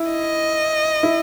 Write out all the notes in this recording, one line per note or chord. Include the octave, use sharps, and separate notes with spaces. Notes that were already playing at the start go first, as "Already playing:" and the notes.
Already playing: E4
D#5
E4